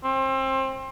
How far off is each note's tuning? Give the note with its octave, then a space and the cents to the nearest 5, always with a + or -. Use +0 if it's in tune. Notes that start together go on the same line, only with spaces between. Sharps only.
C4 +30